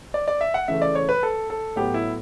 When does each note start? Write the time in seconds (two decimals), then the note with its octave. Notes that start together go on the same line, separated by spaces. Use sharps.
0.14 D5
0.28 D5
0.41 E5
0.54 F#5
0.68 C#3 E3 A3 E5
0.82 D5
0.95 C#5
1.09 B4
1.23 A4
1.50 A4
1.76 A2 F#3 B3 G4
1.94 E4